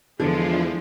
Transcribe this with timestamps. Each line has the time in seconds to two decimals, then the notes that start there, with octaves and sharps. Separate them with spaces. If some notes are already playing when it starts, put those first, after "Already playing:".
0.20 E2 D3 F3 G#3 D4 E4 F4